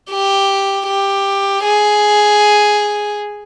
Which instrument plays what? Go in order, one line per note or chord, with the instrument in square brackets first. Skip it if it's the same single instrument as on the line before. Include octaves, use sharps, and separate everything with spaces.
[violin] G4
G4
G#4